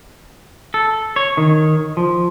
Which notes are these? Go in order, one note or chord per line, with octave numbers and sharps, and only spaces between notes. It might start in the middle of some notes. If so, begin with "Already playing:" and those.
A4
C#5
D#3
F3